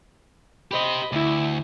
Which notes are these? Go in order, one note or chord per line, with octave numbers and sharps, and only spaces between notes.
G4 C5 D#5 B5
D2 E4